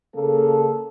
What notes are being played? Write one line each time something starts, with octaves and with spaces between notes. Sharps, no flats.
C#3 A#3 A4